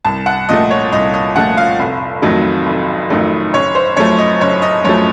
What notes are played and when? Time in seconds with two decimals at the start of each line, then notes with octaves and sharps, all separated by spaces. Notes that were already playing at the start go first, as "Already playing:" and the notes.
0.05 C2 A5
0.26 F#5
0.49 A#2 F3 A3 D#5
0.70 C#5
0.92 C2 D#5
1.14 D#5
1.35 A#2 F3 A3 F#5
1.57 F5
1.79 F1
2.22 F2 D#3 F#3 A3
2.66 F1
3.10 F2 D#3 F#3 A3
3.53 F#1 C#5
3.75 C5
3.96 F#2 F3 A3 C#5
4.18 D#5
4.41 F#1 C#5
4.62 D#5
4.84 F#2 F3 A3 C#5